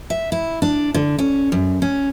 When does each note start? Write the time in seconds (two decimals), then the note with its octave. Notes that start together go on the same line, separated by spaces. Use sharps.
0.10 E5
0.32 E4
0.62 D4
0.94 D3
1.18 C#4
1.52 F#2
1.82 C#4